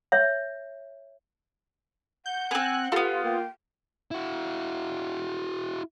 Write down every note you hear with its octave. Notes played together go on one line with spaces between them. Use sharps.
C#5 E5
F#5 G6
B3 C4 G#5 F#6
A3 B3 F4 G4
A#3 G5
E4 F#4